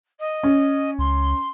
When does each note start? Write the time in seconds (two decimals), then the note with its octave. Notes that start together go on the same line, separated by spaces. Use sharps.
0.19 D#5
0.43 C#4
0.98 C#2 C6